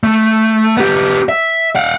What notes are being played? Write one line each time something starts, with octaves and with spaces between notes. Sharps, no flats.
A3
B3 G4
E5
F5 F#5